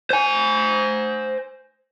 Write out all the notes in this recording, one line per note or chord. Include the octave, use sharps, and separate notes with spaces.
C5 G#5